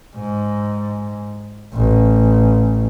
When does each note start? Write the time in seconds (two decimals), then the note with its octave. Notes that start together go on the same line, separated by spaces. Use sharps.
0.15 G#2
1.73 A1